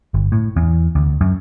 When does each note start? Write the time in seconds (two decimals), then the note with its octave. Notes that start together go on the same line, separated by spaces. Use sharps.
0.14 G1
0.32 A2
0.56 E2
0.95 D2
1.21 F#2